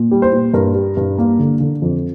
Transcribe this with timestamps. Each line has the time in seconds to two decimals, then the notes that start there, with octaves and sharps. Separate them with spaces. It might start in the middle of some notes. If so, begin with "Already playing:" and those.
Already playing: A#2
0.11 G3
0.22 C5
0.32 A#2
0.54 G2 A#4
0.75 G3
0.97 G2
1.18 A#3
1.39 D3
1.60 D3
1.82 F2